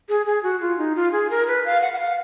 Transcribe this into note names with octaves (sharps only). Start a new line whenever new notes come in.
G#4
G#4
F#4
F4
D#4
F4
G#4
A#4
B4
F5
F#5
F#5
F5